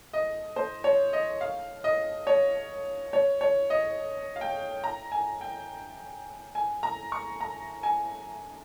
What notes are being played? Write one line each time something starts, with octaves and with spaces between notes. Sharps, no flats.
D#5
C5
C#5
D#5
F5
D#5
C#5
C#5
C#5
D#5
F5
G5
A#5
G#5
G5
G#5
A#5
C#6
A#5
G#5